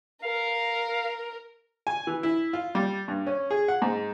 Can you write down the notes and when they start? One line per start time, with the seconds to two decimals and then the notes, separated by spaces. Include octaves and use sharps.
0.23 A#4 F5
1.87 G#5
2.07 E3
2.23 E4
2.53 F4
2.75 G3
3.08 G2
3.27 C#4
3.50 G#4
3.68 F#5
3.82 G#2